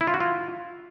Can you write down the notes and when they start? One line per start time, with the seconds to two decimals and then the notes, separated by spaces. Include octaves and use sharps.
0.01 E4
0.07 F4
0.14 F#4
0.20 F4